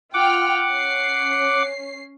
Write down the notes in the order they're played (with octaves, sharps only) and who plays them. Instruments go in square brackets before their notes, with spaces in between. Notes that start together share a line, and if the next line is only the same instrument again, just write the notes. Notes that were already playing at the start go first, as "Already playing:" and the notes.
[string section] F4 G5 F6 [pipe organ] F#5 D6
[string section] C#4 C7